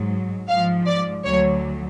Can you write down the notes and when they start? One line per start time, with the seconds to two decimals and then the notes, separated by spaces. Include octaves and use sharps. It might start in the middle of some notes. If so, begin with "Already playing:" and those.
Already playing: G#2 F#3
0.47 G#2 F3 F5
0.87 D5
1.23 D2 D3 F#3 C#5